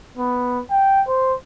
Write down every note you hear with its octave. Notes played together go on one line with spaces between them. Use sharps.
B3
G5
C5